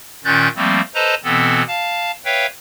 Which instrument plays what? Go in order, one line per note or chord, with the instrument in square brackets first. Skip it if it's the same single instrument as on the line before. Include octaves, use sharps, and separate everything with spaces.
[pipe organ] A#2 D#3 C#4 F#6 G6 A6
F3 G3 A3 A#3 C4
A4 B4 C5 D#5 A5 A#5
B2 E3 B3 C4 A4
F5 A5
B4 C#5 E5 F5 G5